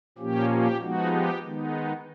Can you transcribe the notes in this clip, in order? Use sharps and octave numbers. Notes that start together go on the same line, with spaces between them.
A#2 F3 A#3 C#4 G4
G4
F3 G#3 B3 D#4 F#4
G4
D#3 G#3 B3 D#4